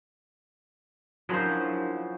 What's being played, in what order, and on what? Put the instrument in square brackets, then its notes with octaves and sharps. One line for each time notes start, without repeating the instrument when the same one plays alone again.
[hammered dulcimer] C#3 F3 [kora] F#3 C5 [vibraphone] D4 E4 A#4